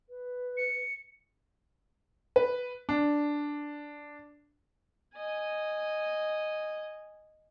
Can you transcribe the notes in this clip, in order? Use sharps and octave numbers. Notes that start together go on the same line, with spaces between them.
B4
C#7
B4
D4
D#5 G#5